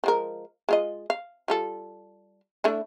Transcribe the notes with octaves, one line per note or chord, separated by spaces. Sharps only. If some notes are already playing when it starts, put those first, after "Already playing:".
F3 G#3 A#4
G#3 F4 D#5
F5
G3 F4 A4
A3 D4 E4